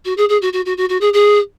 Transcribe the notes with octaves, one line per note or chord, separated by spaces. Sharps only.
F#4
G#4
G#4
F#4
F#4
F#4
F#4
F#4
G#4
G#4